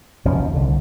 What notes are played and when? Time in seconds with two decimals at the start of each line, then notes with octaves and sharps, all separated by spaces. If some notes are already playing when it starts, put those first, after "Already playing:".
0.25 F1 B2 F3 C#4
0.39 D#2
0.54 C2 D3